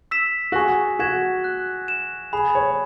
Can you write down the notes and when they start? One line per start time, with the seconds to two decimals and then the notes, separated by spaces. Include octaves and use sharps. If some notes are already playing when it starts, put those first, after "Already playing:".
0.11 E6 B6 E7
0.52 F#4
0.56 G#4 C#6
0.99 F#4 G#6 B6 E7
1.44 F#6
1.88 E7
2.33 G#4 B5
2.55 C#5